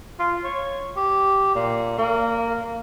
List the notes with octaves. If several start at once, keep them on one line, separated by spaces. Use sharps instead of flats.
F4
C#5
G4
A#2
A#3